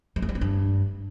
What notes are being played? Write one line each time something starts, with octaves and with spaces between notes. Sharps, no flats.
G#3
A3
G3
B3
G2